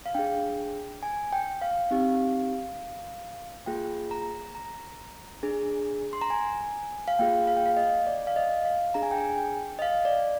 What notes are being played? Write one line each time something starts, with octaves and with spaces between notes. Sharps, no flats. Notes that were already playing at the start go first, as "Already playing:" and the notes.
F5
D4 G#4 G5
G#5
G5
F5
C4 D#4 G4
A#3 F4 G#4 G5
A#5
A#5
D4 G#4
C6
A#5
G#5
F5
A#3 F4 G#4 G5
F5
G5
F5
D#5
D5
F5
D#5
F5
D4 G#4 A#5
G#5
G5
G#5
G5
D#5
F5
D5